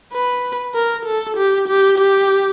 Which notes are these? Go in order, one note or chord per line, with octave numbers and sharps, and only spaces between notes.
B4
A#4
A4
G4
G4
G4